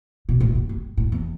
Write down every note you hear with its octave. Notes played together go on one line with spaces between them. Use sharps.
B2
A2
G2
G2
A2
E2